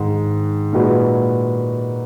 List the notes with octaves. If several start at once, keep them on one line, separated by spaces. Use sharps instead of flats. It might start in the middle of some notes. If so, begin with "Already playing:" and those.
Already playing: G#2 D#3 G#3
A#2 G#3 D#4 F#4 B4